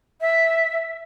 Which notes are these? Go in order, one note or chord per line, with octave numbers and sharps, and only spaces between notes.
E5